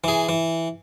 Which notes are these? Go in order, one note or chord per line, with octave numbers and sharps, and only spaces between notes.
E3 G#4
E3